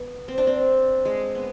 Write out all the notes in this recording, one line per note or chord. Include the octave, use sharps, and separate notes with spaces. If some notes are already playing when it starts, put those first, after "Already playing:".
Already playing: B3
C4
D4
C4
G#3
B3